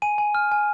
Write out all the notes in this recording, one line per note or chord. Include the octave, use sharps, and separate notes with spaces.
G#5 D#7
G#5
F6
G#5